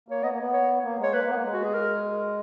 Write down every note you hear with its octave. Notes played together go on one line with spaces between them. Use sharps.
A#3 C#5
B3 D#5
A#3
B3
C#5
A#3
G#3 C#5
A#3 B4
A#3
B3
A#3
G#3
F#4
G#4
A#4